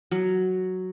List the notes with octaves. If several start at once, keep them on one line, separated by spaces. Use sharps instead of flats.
F#3